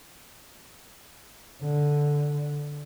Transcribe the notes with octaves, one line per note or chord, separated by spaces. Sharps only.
D3